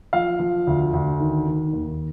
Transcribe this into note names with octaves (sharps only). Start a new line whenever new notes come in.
F3 F5
F3
D2
D2
D#3
D#3
D#2